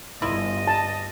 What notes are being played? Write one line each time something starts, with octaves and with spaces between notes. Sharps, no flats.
G1 E4 F4 D#5
A5